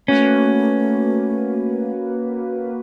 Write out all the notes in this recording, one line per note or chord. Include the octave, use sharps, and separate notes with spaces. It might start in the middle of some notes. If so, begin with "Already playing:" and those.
A3 A#3 C#4 F#4 B4